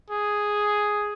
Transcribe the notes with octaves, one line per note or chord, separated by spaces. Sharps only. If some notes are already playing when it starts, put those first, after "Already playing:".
G#4